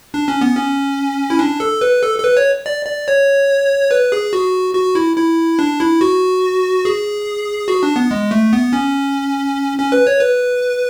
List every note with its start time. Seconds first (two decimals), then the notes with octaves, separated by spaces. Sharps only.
0.14 D4
0.28 C#4
0.41 B3
0.55 C#4
1.30 E4
1.39 D4
1.60 A4
1.81 B4
2.03 A4
2.19 A4
2.24 B4
2.37 C#5
2.66 D5
2.86 D5
3.08 C#5
3.91 B4
4.12 G#4
4.33 F#4
4.75 F#4
4.95 E4
5.16 E4
5.59 D4
5.80 E4
6.01 F#4
6.85 G#4
7.68 F#4
7.83 D4
7.96 B3
8.11 G#3
8.31 A3
8.53 B3
8.73 C#4
9.78 C#4
9.92 B4
10.07 C#5
10.20 B4